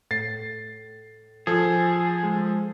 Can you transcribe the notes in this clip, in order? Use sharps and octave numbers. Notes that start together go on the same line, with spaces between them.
A2 A6 C7
F3 G#4 A4
G#3